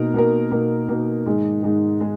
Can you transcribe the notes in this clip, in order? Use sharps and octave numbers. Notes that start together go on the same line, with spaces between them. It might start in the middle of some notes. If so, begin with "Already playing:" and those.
Already playing: B2 A#3 D#4 A#4
B2 A#3 D#4 A#4
B2 A#3 D#4 A#4
B2 A#3 D#4 A#4
G#2 D#3 G#3 D#4 G#4
G#2 D#3 G#3 D#4 G#4
G#3 D#4 G#4